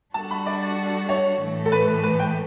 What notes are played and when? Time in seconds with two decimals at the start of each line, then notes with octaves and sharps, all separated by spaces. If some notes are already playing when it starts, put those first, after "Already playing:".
0.14 G3 D4 F#4 A4 A5
0.31 B5
0.46 D5
1.09 C#5
1.41 A2 E3 A3
1.65 A4
1.72 B4
2.03 B4
2.19 G5